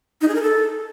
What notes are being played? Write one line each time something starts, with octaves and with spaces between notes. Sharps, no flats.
D#4
G#4
A#4
A4